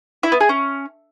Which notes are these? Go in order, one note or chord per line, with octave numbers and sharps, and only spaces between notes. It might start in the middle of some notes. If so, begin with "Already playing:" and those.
E4
B3
G#4
C#4